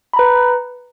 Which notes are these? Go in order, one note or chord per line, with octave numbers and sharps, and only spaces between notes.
B4 A#5 B5